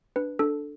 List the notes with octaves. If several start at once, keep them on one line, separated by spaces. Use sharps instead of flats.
D4 B4
D4 A4